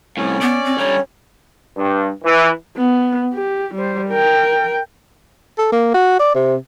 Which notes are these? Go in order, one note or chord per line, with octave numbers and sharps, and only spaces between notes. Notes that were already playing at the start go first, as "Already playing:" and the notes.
C2 A2 C#4
B3 D5
C4
D3 G3 C#5
G2
E3
B3
G4
G3 C5
A#4 G5
A4
A#3
F#4
D5
C3